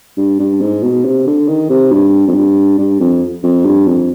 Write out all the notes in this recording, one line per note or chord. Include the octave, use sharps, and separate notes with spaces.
G2
G2
G#2
B2
C3
D3
D#3
C3
G2
F2
G2
G2
F2
F2
G2
F2